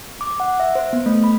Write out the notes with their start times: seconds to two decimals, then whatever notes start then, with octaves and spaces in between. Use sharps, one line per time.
0.21 D6
0.40 F#5
0.60 E5
0.75 C5
0.93 B3
1.06 A3
1.24 B5